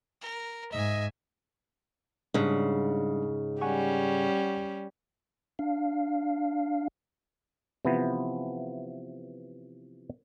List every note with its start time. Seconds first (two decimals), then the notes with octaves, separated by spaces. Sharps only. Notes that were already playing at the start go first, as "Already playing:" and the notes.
0.21 A#4
0.72 G#2 D#5 E5 G#5
2.34 G#2 C#3 G3 D4 D5
3.61 G3 C#4 F#5 G#5 C#6
5.59 D4 F5
7.85 C3 E3 F3 B3